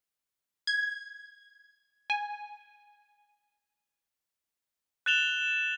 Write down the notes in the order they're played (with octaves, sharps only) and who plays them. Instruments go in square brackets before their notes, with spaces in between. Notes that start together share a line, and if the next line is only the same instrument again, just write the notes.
[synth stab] G#6
G#5
[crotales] F#6 A6 E7 F7 G7